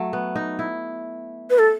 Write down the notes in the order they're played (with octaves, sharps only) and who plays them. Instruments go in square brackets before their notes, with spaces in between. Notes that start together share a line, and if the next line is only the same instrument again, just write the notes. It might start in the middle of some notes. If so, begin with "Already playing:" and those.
Already playing: [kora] F#3 A3
B3
D#4
E4
[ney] B4
A4